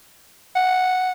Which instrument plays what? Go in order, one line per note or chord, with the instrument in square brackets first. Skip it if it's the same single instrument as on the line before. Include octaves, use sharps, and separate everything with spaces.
[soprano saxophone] F#5